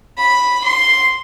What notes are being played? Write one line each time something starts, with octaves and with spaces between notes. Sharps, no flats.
B5
C6